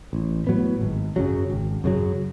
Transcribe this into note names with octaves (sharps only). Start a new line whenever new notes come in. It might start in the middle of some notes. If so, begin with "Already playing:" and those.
A1
A2 F#3 B3
G#1
F#2 C#3 F#3
G#1
F#2 C#3 F#3